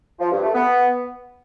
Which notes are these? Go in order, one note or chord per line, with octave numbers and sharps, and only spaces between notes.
F3
G2
A3
B3